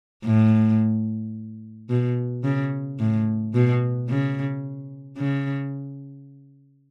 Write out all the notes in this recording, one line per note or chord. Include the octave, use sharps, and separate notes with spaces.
A2
B2
C#3
A2
B2
C#3
C#3